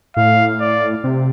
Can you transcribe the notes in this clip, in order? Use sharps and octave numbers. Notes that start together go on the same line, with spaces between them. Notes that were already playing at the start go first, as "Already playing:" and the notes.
A2 F5
D5
C3